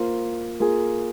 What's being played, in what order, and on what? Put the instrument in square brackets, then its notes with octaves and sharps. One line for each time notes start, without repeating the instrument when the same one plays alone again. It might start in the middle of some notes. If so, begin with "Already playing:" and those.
Already playing: [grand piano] A#3 F4 C5 F5
A#3 F4 G#4